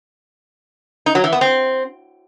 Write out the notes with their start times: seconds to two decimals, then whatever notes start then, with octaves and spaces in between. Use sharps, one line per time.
1.06 D#4
1.15 F#3
1.24 E3
1.32 B3
1.41 C4